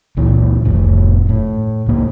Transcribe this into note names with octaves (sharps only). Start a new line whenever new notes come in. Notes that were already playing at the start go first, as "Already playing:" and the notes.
C#2 A#2 E3
F1 A2
A2
C#2 A#3